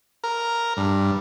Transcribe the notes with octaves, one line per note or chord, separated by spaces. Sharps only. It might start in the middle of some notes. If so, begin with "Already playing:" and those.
A#4
G2